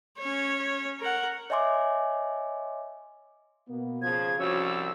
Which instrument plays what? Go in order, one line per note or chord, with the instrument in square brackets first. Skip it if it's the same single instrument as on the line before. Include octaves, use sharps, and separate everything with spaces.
[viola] C#4 C#5
A#4 F#5
[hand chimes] C#5 D#5 E5 G#5 C6 D6
[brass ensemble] B2 A#3 B3
[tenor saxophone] C#3 [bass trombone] F3 [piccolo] G#6
[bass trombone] C2 [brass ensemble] F3 F#4 [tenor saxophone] C#4 [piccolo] E6